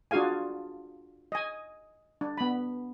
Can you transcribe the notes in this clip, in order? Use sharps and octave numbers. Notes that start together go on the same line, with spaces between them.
D4 F4 F#4 G#4 F5 G#5
D#5 G#5
D4
B3 B5